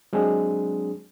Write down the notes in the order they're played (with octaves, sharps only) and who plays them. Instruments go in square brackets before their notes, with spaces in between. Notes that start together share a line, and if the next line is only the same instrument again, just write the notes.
[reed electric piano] F#3 G#3 C4 D4 G#4